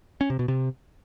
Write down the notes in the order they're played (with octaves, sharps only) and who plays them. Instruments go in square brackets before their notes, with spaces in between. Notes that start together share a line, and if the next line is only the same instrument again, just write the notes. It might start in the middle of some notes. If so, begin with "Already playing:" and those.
[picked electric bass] C#4
C3
B2
C3